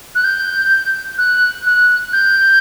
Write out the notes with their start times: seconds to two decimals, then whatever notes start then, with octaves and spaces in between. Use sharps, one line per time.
0.15 F#6
0.24 G6
1.18 F#6
1.66 F#6
2.13 G6